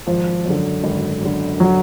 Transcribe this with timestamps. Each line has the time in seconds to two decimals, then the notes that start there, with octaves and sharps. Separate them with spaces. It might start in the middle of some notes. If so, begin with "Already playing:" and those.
0.07 G#1 F3
0.45 F#2 D3
0.84 G#1
1.21 F#2 D3
1.60 F#3